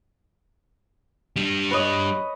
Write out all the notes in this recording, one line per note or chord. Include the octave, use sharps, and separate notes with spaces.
G3 D4
B4 C#5 D#5